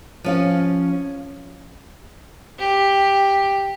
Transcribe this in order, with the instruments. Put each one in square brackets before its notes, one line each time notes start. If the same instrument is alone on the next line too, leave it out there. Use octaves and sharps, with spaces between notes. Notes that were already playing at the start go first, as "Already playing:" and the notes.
[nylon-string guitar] F3 C#4 F5
[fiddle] G4